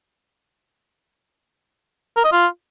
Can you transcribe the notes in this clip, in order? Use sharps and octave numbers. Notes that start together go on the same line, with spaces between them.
A#4
D#5
F4